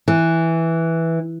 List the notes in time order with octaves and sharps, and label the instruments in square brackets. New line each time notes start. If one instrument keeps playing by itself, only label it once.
[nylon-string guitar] E3